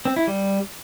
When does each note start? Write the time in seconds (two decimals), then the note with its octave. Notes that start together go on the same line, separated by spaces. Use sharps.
0.05 C4
0.16 E4
0.27 G3